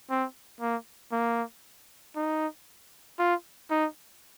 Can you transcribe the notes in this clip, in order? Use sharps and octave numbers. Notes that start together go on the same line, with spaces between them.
C4
A#3
A#3
D#4
F4
D#4